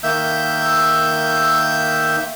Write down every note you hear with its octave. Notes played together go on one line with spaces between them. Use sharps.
D#3 A#3 E5 E6 G6